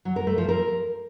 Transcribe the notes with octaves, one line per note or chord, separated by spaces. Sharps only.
F#3
A#4
A3
F3
A#4